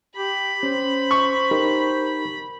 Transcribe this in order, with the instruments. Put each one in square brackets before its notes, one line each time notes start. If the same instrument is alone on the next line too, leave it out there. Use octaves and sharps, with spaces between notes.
[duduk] G4 [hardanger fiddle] B5
[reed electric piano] C#4 [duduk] C5
[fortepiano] C#6
[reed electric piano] D#4 G4 A#4